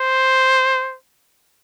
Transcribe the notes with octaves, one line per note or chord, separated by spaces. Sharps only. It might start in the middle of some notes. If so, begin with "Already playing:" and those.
Already playing: C5